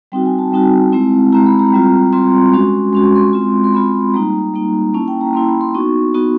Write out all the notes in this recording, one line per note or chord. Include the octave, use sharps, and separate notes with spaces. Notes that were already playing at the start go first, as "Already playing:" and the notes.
G3 C4 D#4 F#4 G5
G#5
A5
G3 C4 D#4 F#4
G#3 C4 E4
G#3 C4 E4 A#5
B5
A#5
G3 C4 F4
G3 C4 F4 C6
G#3 C#4 F#4
G#3 C#4 F#4 C6
C#6
C6
G#3 C4 F4
C6
G#3 C4 F4 B5
G3 A#3 D#4 A#5
G3 A#3 D#4
A#3 C#4 E4 A5
G5
A#5
A#3 C#4 E4 C6
B5
C6
B3 D#4 F#4 C#6
B3 D#4 F#4